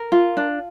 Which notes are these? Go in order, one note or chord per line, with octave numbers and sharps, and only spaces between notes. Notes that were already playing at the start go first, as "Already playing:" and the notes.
Already playing: A#4
F4
D4